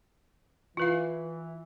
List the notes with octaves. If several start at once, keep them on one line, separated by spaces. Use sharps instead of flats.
E3 F4 B4 F5